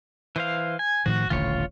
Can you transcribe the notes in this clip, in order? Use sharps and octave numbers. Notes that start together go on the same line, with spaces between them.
E3 C5 F5
G#5
A2 D#3 F3 F#4
D#1 A1 D3 F4 C#5